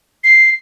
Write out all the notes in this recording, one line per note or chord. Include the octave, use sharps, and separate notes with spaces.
C7